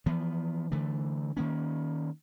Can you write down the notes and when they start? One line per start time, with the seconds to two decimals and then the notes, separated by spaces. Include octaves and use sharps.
0.06 E3 F3 B3
0.72 D3 E3 A3
1.37 D#3 A#3 C#4